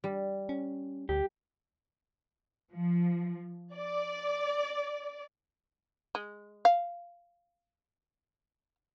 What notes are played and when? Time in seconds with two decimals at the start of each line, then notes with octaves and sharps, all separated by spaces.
0.04 G3
0.49 C#4
1.09 D2 G4
2.74 F3
3.75 D5
6.15 G#3
6.65 F5